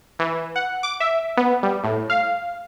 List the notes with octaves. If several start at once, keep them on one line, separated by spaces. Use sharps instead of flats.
E3
F#5
D6
E5
B3
G3
A2
F5